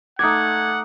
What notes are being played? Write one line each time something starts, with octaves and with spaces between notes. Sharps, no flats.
A3 D#4 D5 F#5 G#6